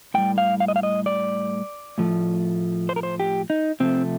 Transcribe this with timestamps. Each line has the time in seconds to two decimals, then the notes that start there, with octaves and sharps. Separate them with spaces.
0.14 A2 G3 G5
0.38 F5
0.60 F5
0.68 D#5
0.76 F5
0.83 D#5
1.06 D5
1.98 A2 F3 A3
2.89 C5
2.96 A#4
3.03 C5
3.20 G4
3.50 D#4
3.80 C3 F3 A3 C4